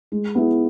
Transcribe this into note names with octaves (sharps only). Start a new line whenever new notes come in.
G#3
B3 E4 G#4